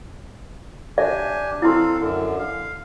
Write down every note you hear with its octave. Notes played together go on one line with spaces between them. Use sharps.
D4 G4 D5 E5 G#5
C4 E4 A4 F5 C6
F#2 D3
F5